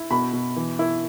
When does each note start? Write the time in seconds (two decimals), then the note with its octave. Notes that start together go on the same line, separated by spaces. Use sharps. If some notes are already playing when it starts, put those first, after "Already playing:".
Already playing: E4
0.11 B2 B5
0.33 B2
0.56 E3
0.79 E4